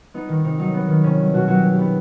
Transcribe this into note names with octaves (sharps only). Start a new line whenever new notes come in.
B3 D#4
D#3
C3 D#4
F#3 D#4
B3
D#3
C3 C#4
F#3
B2 F#4
F#3 F#4
G4
B2
G4
B3